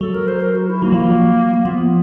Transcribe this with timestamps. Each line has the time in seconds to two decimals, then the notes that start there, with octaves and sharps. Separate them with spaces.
0.01 F#3 A4
0.14 A#4
0.27 C5
0.42 A#4
0.55 F#4
0.69 E4
0.82 F#3 A#3
0.92 F3
1.00 F#3
1.54 A#3
1.65 F3 B3